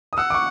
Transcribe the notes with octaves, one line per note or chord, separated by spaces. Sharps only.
D#6
F#5 E6
D6
C#6